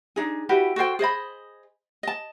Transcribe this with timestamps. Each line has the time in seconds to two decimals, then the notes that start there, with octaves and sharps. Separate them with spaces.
0.16 D4 D#4 G#4
0.49 E4 F#4 G4 B4
0.76 F#4 A4 C5 G5
0.99 G#4 C5 D#5 B5
2.03 D#5 A5